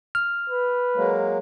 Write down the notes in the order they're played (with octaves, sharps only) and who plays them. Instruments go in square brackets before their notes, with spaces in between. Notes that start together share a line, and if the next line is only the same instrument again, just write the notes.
[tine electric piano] F6
[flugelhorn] B4
[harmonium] F#3 G#3 A#3